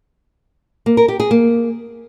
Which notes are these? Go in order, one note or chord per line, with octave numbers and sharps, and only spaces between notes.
A#3
A#4
G4
G#4
A#3